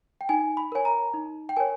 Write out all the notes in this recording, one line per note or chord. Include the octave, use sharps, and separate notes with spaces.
G5
D#4 G#5
B5
A#4 C#5 G#5
A#5
D#4
G5
A#4 C#5 G#5